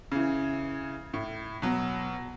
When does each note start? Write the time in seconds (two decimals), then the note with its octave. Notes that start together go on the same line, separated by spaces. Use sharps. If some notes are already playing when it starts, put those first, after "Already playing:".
0.12 C#3 E3
1.14 A2
1.62 B2 F#3